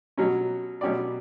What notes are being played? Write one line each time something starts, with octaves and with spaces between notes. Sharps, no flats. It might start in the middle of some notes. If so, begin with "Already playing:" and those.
B2 F#3 C#4
B2 F#3 C#4 G4 D5